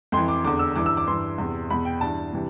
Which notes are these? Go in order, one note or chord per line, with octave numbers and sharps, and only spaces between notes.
F2 E3 C6
D6
E2 D3 D6
E6
G2 E3 D6
E6
D6
G2 E3 C6
E2 C3 E3
E2 B2 B5
G5
G2 E3 A5
C3 E3